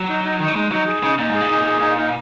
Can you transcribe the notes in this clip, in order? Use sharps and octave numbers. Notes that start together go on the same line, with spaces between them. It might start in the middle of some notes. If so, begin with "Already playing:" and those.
Already playing: F#3
D#4
D#4
D#3 D#4
F#3
G#3 D#4
F#3 D#4
G#4
C#3 D#4
A#2 D#4
G#2
G#4
A#2
D#4
G#4
D#4
D#4